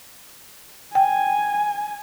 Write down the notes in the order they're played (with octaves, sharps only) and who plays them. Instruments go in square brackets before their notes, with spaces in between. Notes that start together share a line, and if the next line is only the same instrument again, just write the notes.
[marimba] G5 [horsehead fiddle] G#5